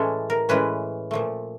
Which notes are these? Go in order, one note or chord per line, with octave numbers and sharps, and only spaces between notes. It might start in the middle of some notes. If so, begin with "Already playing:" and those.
Already playing: A2 E3 G#3 C#4 A4
A#4
A2 E3 G#3 C#4 B4
A#2 F3 A3